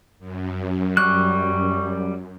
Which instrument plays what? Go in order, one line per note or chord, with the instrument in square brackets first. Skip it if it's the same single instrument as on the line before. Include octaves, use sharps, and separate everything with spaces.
[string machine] F#2
[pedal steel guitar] G3 F#6 [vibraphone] C#6